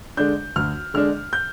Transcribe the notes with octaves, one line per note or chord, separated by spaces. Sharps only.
D3 G#3 D4 G6
D2 F6
D3 G#3 D4 F6
G6